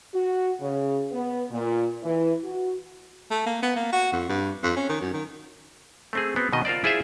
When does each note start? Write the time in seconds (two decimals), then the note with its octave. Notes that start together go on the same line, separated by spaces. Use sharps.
0.14 F#4
0.60 C#3
1.11 B3
1.50 A#2
2.03 E3
2.43 F#4
3.31 A3
3.46 A#3
3.63 B3
3.76 A#3
3.93 F#4
4.13 F2
4.29 G2
4.63 F2
4.76 C#4
4.89 D#3
5.01 F#2
5.13 D#3
6.13 A3 C4 G#4
6.36 B3 C4 F#4
6.53 B2 D#3 D#5
6.65 F4 A#4 C5 D5
6.84 E4 F4 G#4 C5 D5 E5